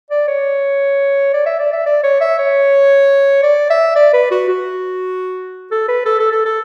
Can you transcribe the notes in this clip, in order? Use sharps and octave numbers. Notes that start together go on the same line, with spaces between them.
D5
C#5
D5
E5
D5
E5
D5
C#5
E5
C#5
D5
E5
D5
B4
F#4
F#4
A4
B4
A4
A4
A4
A4